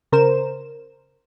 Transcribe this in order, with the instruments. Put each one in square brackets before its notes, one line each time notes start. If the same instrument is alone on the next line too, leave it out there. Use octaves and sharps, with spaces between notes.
[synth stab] C#3 A#4 C5 E7